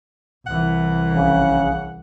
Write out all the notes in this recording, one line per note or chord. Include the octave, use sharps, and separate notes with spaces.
C2 E3 F#5
A#1 C#3